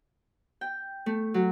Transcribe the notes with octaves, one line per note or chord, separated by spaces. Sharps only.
G5
A3
F#3